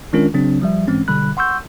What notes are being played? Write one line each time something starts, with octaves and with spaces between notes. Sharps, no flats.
D#3 G#3 C#4 D4 F4 A#4
C#3 F#3 C4 D4
F3 G3 E5
G#2 E3 G#3 C4 C#4
B2 D3 G3 B5 F#6
F#5 C6 C#6 E6 G6